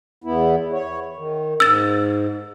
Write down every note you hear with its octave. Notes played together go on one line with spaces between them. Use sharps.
E2 B3 E4
C#5
D#3
G#2 E6 A6